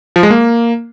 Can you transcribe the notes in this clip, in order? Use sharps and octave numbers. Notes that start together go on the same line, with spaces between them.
F3
G#3
A#3